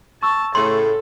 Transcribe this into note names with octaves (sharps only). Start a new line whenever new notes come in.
A5 C#6 E6
A2 C#3 A3 A4 C6